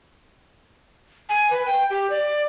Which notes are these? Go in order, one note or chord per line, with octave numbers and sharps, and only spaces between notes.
G#5
B4
G5
G4
D5